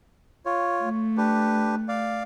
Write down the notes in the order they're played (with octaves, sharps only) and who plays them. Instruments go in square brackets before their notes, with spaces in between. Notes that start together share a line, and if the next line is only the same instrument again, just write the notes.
[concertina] F4 C#5
[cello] A3
[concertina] D4 G4 B4
D5 F5